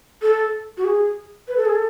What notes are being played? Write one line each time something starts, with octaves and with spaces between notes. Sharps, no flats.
A4
F#4
G#4
B4
A4
G#4
A4